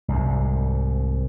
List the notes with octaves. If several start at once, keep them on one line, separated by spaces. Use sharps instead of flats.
C2 G#2